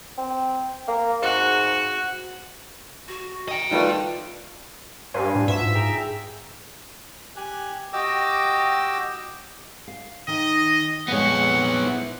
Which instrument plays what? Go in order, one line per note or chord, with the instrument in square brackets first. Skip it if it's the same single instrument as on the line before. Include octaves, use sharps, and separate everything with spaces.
[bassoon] C4
A#3
[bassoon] G#2 [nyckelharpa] F#4
[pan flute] F#4
[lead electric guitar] D#5 G5
[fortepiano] D#3 G3 A3 [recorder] F4 [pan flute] B4
[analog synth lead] G2 [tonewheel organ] C5 F5 G#5
[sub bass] A2
[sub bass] G2 [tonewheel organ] F#4 B4 [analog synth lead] E5
[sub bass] G#2 [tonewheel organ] F4
[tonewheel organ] G#4 G5 A#5
[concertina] G4 G#5 F#6
F#4 G4 D#5 G5 D6 E6
[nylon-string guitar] F5
[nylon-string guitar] D#3 [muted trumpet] D#5
[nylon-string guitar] F2 A#2 G#3 [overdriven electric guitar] B3 C#5 [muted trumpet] F#5
[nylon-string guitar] E4 C5